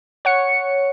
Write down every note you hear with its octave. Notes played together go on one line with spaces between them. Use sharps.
C#5 F#5 C#7